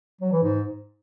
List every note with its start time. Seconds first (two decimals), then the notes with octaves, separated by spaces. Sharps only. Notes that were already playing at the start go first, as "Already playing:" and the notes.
0.21 F#3
0.32 E3
0.43 G#2